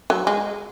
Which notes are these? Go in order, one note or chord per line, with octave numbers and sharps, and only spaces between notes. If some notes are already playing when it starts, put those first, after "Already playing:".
F#3
G#3